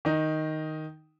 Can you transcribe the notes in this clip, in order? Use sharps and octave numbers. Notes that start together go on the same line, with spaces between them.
D#3 D#4